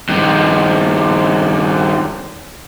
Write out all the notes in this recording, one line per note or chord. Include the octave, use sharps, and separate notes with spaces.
G2 D#3